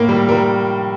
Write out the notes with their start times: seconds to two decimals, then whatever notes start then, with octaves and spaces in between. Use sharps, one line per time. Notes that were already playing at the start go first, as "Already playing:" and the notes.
Already playing: A2 A#3 A#4
0.09 G3
0.29 G3 A#4